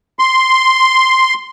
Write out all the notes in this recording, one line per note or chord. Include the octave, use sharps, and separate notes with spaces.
C6